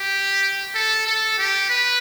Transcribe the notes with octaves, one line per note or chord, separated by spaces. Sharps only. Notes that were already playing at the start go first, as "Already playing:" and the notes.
Already playing: G4
A4
A4
G4
B4